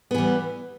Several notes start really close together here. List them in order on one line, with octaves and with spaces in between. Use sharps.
B3 E3 G3